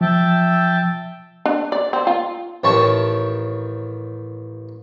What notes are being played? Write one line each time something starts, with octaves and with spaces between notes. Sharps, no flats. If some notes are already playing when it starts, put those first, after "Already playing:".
F3 E5 G5 A5
D4
D5
C4
F4
A1 D#3 C#5 A5 C#6